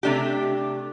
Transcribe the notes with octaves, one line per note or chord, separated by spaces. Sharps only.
C3 A3 D4 G4